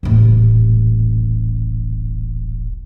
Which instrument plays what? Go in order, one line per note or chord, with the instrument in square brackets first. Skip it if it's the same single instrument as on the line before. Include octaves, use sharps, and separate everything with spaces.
[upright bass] D#1 A1